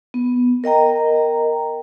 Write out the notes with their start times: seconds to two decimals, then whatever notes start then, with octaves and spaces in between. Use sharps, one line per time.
0.14 B3
0.64 A#4 D#5 G5 A#5